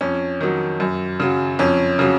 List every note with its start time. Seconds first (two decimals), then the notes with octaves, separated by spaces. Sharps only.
0.01 F2 C#4
0.40 D#3 F#3
0.80 F#2
1.20 C#3 F#3
1.59 F2 C#4
1.99 C#3 F#3